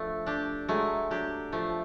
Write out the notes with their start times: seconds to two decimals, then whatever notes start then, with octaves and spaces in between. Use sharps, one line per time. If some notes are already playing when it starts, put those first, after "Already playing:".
Already playing: F3 A3 D4
0.26 D4 G4
0.69 F#3 G#3 A3
1.11 F#3 D4 G4
1.52 F3 A3